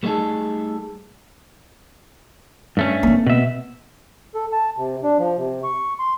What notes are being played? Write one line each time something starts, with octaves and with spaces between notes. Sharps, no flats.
G3 A3 B3 D#4 G#4 A4
G2 A3 C#4
A#3 C4
B2 E5
A4
A5
C3
D4
F3
C3
C#6
C6